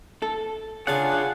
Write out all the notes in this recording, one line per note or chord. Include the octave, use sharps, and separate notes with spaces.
A4
C#3 D4 F4 G#4 F5 F#5 G#5